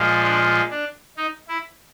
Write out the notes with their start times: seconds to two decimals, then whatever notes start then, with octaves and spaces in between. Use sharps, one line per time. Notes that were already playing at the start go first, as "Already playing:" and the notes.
Already playing: A#2 F3 G#3
0.24 D4
0.71 D4
1.17 D#4
1.48 E4